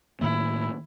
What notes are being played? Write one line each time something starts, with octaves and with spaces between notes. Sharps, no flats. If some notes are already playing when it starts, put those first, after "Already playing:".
A2 D#3 A#3 E4